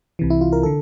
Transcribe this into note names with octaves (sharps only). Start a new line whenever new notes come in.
C2 C3 E3
E4
F4
A#4
D3 A4